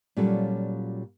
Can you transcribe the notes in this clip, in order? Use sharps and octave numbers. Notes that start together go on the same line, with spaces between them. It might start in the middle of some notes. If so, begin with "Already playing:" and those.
A#2 F#3 G3 C#4 F4 A4